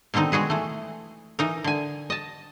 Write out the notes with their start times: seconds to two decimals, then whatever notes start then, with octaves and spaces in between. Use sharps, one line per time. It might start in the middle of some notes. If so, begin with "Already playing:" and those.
0.14 B2 D3 D#3 C4 D#4
0.32 G#3 F#4 G#4 B4
0.50 E3 A3
1.39 E3 D#4 A#4
1.64 D3 G#5
2.10 D#5 A5